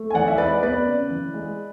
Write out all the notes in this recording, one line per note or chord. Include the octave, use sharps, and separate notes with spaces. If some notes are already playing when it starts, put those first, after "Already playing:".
Already playing: A3
G#5
E3 D5 F#5
E5
G#3 B4 D5
B3 B4 D5
C#3
E3
G#3